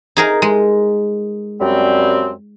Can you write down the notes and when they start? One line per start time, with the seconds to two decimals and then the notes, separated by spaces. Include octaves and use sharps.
0.17 D#4 G#4 A#4
0.42 G#3
1.60 F#2 G3 C4